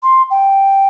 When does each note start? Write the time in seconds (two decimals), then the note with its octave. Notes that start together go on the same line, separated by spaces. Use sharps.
0.03 C6
0.31 G5